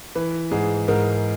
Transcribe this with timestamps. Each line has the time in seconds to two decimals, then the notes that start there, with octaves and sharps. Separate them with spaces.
0.15 E3 B4
0.51 G#2 G#4
0.88 G#2 A#4